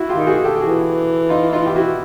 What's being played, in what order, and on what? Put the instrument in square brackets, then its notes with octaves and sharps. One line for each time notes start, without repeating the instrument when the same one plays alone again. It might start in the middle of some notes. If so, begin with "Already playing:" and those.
Already playing: [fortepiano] E4 F#4
F4 G4
[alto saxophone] D#3
[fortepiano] F#4 G#4
G4 A4
G4
[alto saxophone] E3 [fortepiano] F#4 G#4
[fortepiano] D#4 F4
D#4 F4
G4
E4 F#4